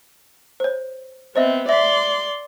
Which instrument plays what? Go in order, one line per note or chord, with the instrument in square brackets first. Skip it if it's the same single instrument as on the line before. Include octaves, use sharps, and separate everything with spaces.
[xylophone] C5 C#5
[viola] B3 C4 [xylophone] C5 D#5 E5
[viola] D5 C6 [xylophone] E5 B6